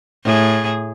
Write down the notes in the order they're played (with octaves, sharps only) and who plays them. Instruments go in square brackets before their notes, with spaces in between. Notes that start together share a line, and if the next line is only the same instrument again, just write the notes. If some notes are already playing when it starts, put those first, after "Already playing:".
[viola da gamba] A2 G#4